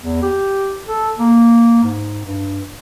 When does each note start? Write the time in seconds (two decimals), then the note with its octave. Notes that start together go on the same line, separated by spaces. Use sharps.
0.03 E2
0.23 G4
0.86 A4
1.19 A#3
1.83 G#2
2.25 G2